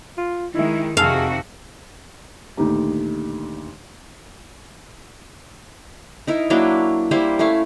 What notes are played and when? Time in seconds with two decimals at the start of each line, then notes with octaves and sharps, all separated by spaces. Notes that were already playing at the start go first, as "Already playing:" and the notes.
0.17 F4
0.55 D#3 G#3 D#4 E4 E5
0.97 F2 C3 D#3 F#4 G#4 F5 A5 E6
2.57 D2 A#2 D#3 D#4 G4 A#5
6.27 D#4 E4 A#4
6.50 F#3 A#3 D4 E4
7.11 G3 A#3 E4 C5
7.39 A3 C#4 E4 F5